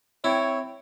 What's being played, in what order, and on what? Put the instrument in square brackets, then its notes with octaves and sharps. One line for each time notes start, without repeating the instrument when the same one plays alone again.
[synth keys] C4 G5 [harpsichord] E4 [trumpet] C#5